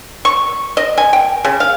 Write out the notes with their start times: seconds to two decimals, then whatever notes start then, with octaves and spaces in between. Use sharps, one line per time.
0.25 C#6
0.77 D#5
0.98 G#5
1.13 G5
1.45 C#3
1.60 F5